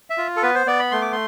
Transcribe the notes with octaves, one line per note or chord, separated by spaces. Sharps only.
E5
F4
A4
B3 B4
C5
B3 D5
B5
A3 C6
D6
C6